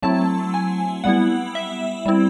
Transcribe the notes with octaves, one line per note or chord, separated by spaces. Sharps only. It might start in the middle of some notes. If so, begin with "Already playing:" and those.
F#3 A3 C4 E4 A5
G#5
G3 B3 E4 F#5
E5
G3 C4 E4